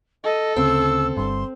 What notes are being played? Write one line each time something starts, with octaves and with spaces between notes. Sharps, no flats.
A4 D#5
D2 C#3 C4 E6
G1 G2 C6